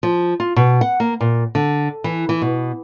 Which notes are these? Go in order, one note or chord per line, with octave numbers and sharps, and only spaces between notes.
F3
F4
B2
F#5
A#3
A#2
D3
E3
E3
B2